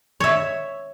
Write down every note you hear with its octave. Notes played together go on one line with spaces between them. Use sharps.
C#5 E5